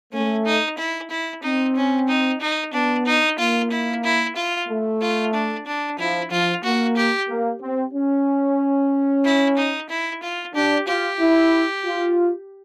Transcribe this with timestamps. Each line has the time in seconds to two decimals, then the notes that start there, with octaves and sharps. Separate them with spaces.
0.13 A3 C#4
0.46 D#4
0.78 E4
1.11 E4
1.43 C4 D#4
1.76 C#4
2.08 D#4
2.41 D#4
2.74 B3 D4
3.06 D#4
3.39 A#3 F4
3.71 E4
4.04 E4
4.37 F4
4.68 A3
5.02 F4
5.34 D4
5.67 D4
5.99 F3 E4
6.31 F3 F4
6.64 A#3 F#4
6.97 G4
7.29 A#3
7.61 C4
7.94 C#4
9.25 E4
9.57 D#4
9.90 E4
10.23 F4
10.54 D4 G4
10.87 F4 G4
11.20 E4
11.85 F4